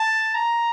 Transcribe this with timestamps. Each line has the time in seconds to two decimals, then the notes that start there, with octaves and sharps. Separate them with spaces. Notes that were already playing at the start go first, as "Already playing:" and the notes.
Already playing: A5
0.34 A#5